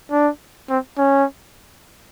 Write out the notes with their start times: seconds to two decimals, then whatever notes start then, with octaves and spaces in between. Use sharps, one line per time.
0.12 D4
0.69 C4
0.98 C#4